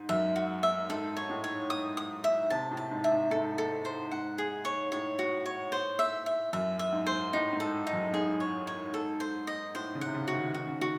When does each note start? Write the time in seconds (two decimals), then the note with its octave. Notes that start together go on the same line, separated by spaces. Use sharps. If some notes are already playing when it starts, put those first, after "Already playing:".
Already playing: G#2
0.09 F#2 E5
0.36 F#4
0.63 E5
0.89 G#2 A4
1.17 C#5
1.30 A2
1.44 C#5
1.70 D#6
1.97 D#6
2.24 E5
2.50 C3 A5
2.71 A2
2.77 A5
2.91 G#2
3.04 E5
3.11 G#2
3.30 G#2 A4
3.58 A4
3.85 C5
4.11 G#2 F#5
4.38 G#4
4.65 C#5
4.92 A2 C#5
5.19 F#4
5.46 C#5
5.72 C5
5.99 E5
6.26 E5
6.53 F#2 E5
6.79 E5
6.92 G#2
7.06 C5
7.33 A2 D#4
7.53 G#2
7.60 A4
7.87 D#4
7.93 F#2
8.13 G#2 G#4
8.40 C#5
8.67 C#5
8.94 A4
9.20 C5
9.47 D#5
9.74 A2 C5
9.95 C#3
10.01 C3 F#5
10.15 C#3
10.28 F#4
10.35 D#3
10.54 D#3 F#4
10.67 C#3
10.79 D#3 F#4